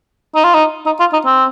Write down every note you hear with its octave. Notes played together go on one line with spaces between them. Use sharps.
D#4
F4
D#4
D#4
F4
D#4
C4